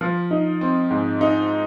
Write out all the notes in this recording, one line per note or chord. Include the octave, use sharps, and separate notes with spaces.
F3
D#4
C4
G#2
D#4